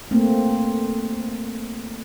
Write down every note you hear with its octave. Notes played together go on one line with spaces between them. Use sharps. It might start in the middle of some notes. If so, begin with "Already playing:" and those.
A3 A#3 C4